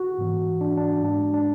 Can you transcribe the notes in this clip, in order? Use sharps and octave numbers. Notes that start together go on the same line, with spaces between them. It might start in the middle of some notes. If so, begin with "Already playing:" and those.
Already playing: F#4
G#2 E3 B3
D4
D4
G#2 G#3 D4
D4